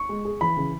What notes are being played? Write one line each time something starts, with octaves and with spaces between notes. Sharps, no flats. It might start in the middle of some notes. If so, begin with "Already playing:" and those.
Already playing: C#6
G#3
G#4
E3 B5
C#3